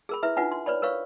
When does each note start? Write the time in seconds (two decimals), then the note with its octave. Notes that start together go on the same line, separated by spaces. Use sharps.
0.09 G#4 A#4 B5
0.23 E4 B4 E5
0.37 D4 D#4 F4 B4 F#5
0.51 C6
0.66 B4 C#5 D5 B5
0.82 A#4 B4 C#5 F5 C#6